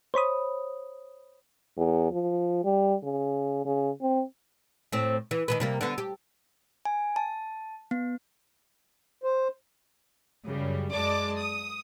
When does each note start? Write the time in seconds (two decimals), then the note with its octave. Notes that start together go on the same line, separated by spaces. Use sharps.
0.14 C5 C#5 B5 D#6
1.77 E2
2.12 F3
2.64 G3
3.04 C#3
3.66 C#3
4.02 C4
4.92 A2 C4
5.31 E3
5.48 D#3 F3 B4
5.60 C3 G3 A#3
5.81 D3 B3
5.98 G4
6.85 G#5
7.16 A5
7.91 B3
9.23 C5
10.46 F#2 C#3 G3
10.92 F#2 G#3 D5 A5 D6
11.38 D#6